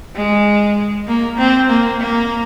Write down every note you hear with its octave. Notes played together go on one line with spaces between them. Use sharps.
G#3
A#3
C4
A#3
A#3